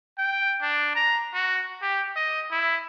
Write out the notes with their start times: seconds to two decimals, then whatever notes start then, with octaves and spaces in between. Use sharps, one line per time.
0.18 G5
0.62 D4
0.95 A#5
1.34 F#4
1.82 G4
2.16 D#5
2.51 E4